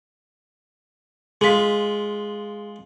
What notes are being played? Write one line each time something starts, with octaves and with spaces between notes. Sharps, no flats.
G#3 F4 G#4 B6